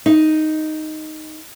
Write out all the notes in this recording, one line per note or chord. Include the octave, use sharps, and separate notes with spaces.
D#4